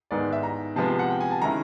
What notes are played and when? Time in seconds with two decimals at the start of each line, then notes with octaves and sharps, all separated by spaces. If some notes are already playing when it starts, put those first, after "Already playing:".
0.11 G#2 D#3 G#3 B3 D5
0.33 E5
0.43 A#5
0.76 C3 F3 G#3 B3 A5
0.99 F#5
1.10 G5
1.21 G#5
1.31 A5
1.42 D#3 G#3 C#4 E4 A#5